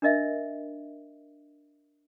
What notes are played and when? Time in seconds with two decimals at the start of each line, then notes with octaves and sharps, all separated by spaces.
0.02 D4 A#4 D#5 E5